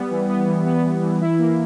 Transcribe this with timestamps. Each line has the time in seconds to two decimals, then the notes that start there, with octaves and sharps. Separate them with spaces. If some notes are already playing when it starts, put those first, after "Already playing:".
Already playing: G3 B3
0.11 E3
0.29 B3
0.47 E3
0.66 B3
0.84 E3
1.03 E3
1.21 E4
1.39 A#3